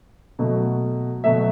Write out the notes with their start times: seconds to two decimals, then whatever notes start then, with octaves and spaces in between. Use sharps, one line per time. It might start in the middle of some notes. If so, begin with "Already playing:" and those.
0.39 B2 F#3 A3
1.24 B2 F#3 A3 E5